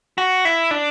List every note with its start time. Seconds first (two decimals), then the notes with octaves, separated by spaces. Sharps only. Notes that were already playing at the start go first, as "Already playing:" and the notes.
0.18 F#4
0.45 E4
0.71 D4